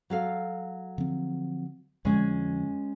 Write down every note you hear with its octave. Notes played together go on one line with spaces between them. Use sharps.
F#3 A4 F5
D3 F3 C4
F2 D3 F3 G#3 C#4